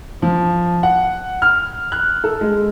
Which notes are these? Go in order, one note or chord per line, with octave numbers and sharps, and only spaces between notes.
F3
F#5
F6
F#6
A4
G#3